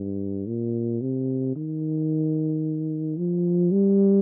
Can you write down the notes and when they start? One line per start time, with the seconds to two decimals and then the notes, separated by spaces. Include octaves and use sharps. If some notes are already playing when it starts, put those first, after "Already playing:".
Already playing: G2
0.47 A#2
1.01 C3
1.56 D#3
3.17 F3
3.72 G3